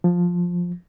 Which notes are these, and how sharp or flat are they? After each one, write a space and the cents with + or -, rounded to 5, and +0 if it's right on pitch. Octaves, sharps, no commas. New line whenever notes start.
F3 +10